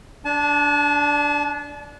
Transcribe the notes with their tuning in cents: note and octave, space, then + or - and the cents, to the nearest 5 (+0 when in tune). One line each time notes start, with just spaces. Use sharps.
D4 -10 A5 -40